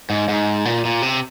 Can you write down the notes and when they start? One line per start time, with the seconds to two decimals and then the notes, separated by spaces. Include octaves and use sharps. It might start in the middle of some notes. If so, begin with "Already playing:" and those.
0.10 G#2
0.29 G#2
0.65 A#2
0.85 A#2
1.02 C3